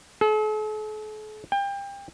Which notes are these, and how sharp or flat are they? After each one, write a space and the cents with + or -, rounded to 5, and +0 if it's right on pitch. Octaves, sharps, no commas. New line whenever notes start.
A4 -45
G5 +30